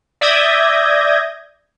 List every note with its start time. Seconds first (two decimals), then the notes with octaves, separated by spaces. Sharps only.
0.21 D5 E5 D#6 G6 G#6 A#6